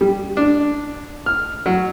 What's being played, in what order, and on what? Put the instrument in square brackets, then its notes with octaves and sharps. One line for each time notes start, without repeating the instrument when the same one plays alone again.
[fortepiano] G3
D4
F6
F#3